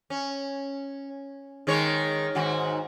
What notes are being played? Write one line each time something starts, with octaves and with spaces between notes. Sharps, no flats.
C#4
D#3 G#3 C#5
G#2 D#3 F#4